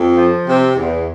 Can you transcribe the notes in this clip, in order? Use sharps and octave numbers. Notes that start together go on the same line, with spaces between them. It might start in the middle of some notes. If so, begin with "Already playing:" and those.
Already playing: F2
F3
C3
E2